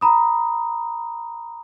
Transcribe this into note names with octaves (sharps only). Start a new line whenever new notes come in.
A#5 B5 D#6